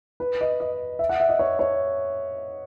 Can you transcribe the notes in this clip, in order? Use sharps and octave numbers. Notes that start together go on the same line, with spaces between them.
B4
D#5
D#5
E5
F#5
E5
D#5
C#5
C#5